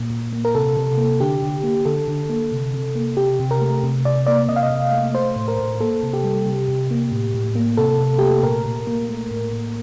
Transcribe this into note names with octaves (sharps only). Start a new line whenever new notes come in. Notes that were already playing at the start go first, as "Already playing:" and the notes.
Already playing: A#2 A#3
A#2
A#3
A#4
C3 A4
C3
A#3
D3 G4
D3
A#3
D3 A4
D3
A#3
C3
C3
A#3
C3 G4
C3
A#4
A3
C3
C3 D5
A#3 D5
C3 D#5
F5
D#5
C3
A3
A3 C5
A2
A#4
A2
A#3 A4
C3
G4
G3
C3
C3
A#3
A2
A2
A#3
C3 A4
C3
A3 G4
A4
A#2 A#4
A#2
A#3
A3
A2
A2